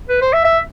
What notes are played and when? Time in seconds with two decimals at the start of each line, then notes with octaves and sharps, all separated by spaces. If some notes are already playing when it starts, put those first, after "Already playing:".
0.09 B4
0.21 C5
0.33 E5
0.45 E5